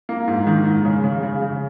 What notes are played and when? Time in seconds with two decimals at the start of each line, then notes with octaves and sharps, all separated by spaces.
0.09 A#3
0.28 G#2
0.47 D#3
0.65 G#2
0.85 C#3
1.04 C#3
1.23 C#3
1.42 C#3